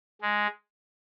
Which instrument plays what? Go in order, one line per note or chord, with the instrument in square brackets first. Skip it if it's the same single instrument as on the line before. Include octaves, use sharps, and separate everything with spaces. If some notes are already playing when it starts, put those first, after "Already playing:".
[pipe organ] G#3